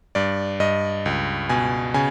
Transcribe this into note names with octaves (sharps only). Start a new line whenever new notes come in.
G2 D5
G2 D#5
C#2
B2 G#5
C#3 G#5